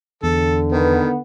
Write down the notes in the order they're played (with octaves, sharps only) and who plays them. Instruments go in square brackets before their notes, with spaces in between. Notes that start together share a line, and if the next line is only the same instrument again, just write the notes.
[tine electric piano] E2 [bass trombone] D3 [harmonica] A4
[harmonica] D#3 [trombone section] B3